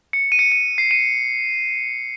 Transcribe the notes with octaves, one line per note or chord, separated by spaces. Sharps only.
C#7
D#7
C#7
D#7
C7
D#7